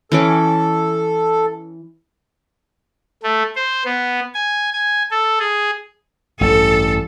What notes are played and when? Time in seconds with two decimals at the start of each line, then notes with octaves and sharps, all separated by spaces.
0.12 E3 C#4 A4 D6
3.23 A3
3.55 C5
3.85 B3
4.34 G#5
4.73 G#5
5.10 A4
5.39 G#4
6.41 A1 G2 A4